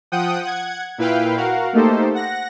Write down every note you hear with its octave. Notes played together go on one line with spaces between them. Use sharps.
F3 F#5 G5 D#6
F#5 G#6
A#2 E4 B4 F5 G5
F#4 A#4 F5 F#5
A3 A#3 D#4 G4 A4 C5
F#5 A#6